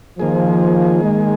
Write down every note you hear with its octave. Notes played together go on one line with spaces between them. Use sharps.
D#3 F3 A#3 G#4
G#3